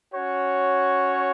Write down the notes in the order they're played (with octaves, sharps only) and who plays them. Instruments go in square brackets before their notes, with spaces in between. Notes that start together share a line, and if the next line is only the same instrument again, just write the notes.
[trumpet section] C#4 F#4 C#5